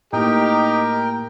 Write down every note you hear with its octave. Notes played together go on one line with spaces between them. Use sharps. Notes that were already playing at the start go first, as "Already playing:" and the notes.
A2 A#3 D#4 G4 A#4 G5